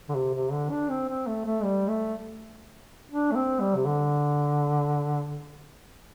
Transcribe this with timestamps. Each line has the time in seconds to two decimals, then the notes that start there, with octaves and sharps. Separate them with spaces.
0.09 D3
0.15 C3
0.34 C3
0.52 D3
0.71 D4
0.90 C4
1.08 C4
1.27 A3
1.45 A3
1.64 G3
1.88 A3
3.11 D4
3.31 A3
3.35 C4
3.60 G3
3.76 C3
3.86 D3